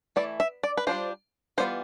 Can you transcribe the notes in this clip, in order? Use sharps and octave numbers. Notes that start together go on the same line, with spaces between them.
E3 A3 E4 D5
E5
D5
B4
G3 D4 F4 C5
E3 G3 B3 F4 C5